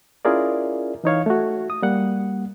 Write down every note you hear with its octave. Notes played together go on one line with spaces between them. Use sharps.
C#4 E4 F4 G#4 A#4 D5
E3 D#4 C#5 F5
A3 F#4
D#6
G3 A#3 F#5